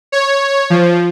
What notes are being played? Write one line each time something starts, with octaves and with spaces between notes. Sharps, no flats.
C#5
F3